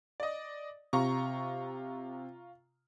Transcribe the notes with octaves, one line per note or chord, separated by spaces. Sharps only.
D5 D#5
C3 F4 A#5 C#6